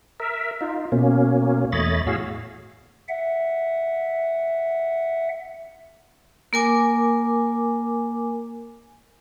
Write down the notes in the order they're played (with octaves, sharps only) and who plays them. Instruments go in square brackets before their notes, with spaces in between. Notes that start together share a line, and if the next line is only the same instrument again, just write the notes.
[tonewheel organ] A#4 E5
D#4 F4
B2 A#3 C#4
E2 A3 C#5 D#5 B5 A6
A2 F#4 G#4 C#5 F5 E6
[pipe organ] E5 F#5
[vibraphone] A#3 A#4 G#5 D6